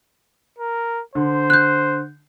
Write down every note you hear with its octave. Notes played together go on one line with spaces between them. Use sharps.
A#4
D3 C5
F#6 G6